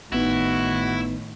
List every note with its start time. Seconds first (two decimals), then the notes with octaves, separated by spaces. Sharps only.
0.12 G#1 A2 D#3 B3 D#4 E4 F#4